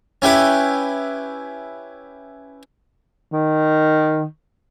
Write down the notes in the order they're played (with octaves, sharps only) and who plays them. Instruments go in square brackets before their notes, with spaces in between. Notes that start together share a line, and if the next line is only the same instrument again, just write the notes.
[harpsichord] C#4 E4 G4 B4
[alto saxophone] D#3